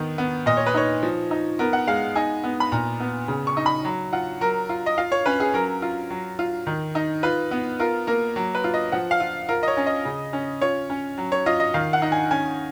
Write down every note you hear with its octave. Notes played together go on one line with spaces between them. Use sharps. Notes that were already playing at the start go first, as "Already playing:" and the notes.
Already playing: D#3 B3
B3
A#2 D#5
C#5
B4
D#4 C#5
F3
D#4
B3 A#4
F#5
G#3 F5
D#4 G#5
B3
B5
A#2 A#5
B3
C#3
C#6
D#4
B5
F#3
F4 F#5
F#3 A#4
F4
D#5
F4 F5
C#5
C#4 B4
G#4
F#3 A#4
F4
F#3
F4
D#3
D#4
F4 B4
B3
F4 A#4
A#3 A#4
F#3
B4
F4
D#5
F3 F#5
F5
F4
F4 A#4
D#5
C#5
C#4
D#5
C#3
C#4
F4 C#5
C#4
F#3
C#5
F4 D#5
D#5
D#3 F5
F#5
D#4
G#5
C#4 G#5